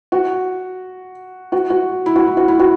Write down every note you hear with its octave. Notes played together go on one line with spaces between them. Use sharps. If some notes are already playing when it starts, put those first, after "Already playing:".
F#4
F#4
F#4
E4
F#4
E4
F#4
E4
F#4